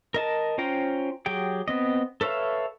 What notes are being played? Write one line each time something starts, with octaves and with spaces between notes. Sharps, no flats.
A#4 D#5 A5
C#4 F4 C5 G5 A#5
F#3 G4 G#4 G5
B3 C4 D#5
A4 B4 C#5 E5 F5